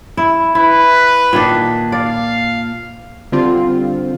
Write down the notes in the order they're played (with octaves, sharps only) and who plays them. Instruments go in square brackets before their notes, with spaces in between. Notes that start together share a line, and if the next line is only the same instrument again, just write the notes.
[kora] E4
[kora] E4 [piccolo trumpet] B4
[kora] A#2 D#3 D4
[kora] D5 [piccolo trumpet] F5
[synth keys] D3 G3 C4 F4